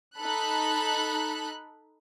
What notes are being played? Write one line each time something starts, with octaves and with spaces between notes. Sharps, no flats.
D#4 A4 B5 F#6